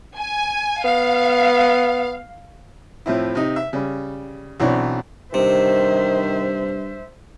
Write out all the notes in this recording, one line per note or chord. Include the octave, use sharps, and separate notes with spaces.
G#5
B3 F5
A2 F3 C4 E4
C3 D#4
E5
C#3 G3
B1 E3 F#3 C4 D4 C#5
G2 C3 D#3 C5 E5